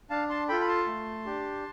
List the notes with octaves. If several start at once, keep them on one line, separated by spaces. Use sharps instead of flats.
D4 F5 A5
A5 C6
F4 A4 G5 B5
B5
A5 C6
A3
D4 G4